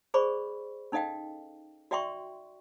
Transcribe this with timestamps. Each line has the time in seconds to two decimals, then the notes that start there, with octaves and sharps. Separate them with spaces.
0.14 G#4 C5 D5 B5 C#6
0.92 C#4 D#4 A4 D#5 F5 G5
1.91 F#4 D5 E5 G5 C6 C#6